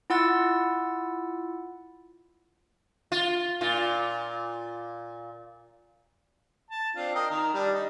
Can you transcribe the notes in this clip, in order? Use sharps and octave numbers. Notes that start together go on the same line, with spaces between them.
E4 F4 F#5 E6 A6
F4
A#2 F4
A5
C4 D4 F4
A#4 D#5 G5
D#3 A#5
G3 D4
D#4